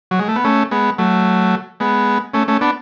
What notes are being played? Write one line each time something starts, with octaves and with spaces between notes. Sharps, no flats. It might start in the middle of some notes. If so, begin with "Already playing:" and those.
F#3
G#3
A3
B3
A3 C#4
G#3 B3
F#3 A3
G#3 B3
A3 C#4
A3 C#4
B3 D4